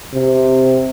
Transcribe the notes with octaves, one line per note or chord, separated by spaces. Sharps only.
C3